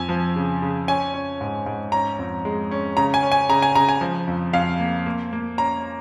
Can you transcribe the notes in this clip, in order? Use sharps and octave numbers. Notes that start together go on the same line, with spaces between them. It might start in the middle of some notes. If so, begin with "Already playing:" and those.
Already playing: F2 G#5
F3
C#3
C#3
C#4 G#5
C#4
G#2
G#2
C#4 A#5
F2
G#3
C#4
C#3 A#5
G#5
C#4
G#5
C#3 A#5
G#5
C#3 A#5
G#5
F3
F2
F2 F5
A#3
A#3
A#3
C#4 A#5